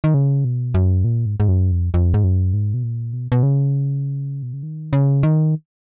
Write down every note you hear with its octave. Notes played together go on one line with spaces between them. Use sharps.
D#3
C#3
B2
F#2
A#2
G#2
G#2
F#2
F2
F2
G#2
F#2
G#2
B2
A#2
B2
B2
C#3
B2
C#3
D#3
C#3
D#3